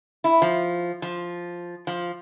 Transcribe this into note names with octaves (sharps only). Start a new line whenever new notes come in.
E4
F3
F3
F3